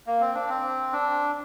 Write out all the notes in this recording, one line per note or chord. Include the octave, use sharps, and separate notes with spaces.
A#3
C4
D4
C4
D4